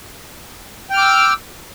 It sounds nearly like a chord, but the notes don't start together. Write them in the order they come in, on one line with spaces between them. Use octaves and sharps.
G5 F6 D6 E6